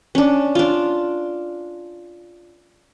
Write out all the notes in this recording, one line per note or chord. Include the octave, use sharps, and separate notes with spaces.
C#4 D4
D4 F4